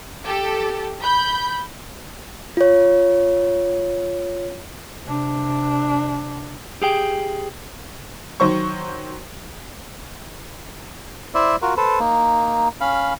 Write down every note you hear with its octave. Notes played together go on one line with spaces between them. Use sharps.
G4 A4
B5 G6
F4 C#5
C3 D4
G4 G#4 G5
D#3 F#3 C5 C#6
E4 C5 D5 E5
F4 F#4 A#4
A4 B4 C5
A#3 D#4
C#4 F5 B5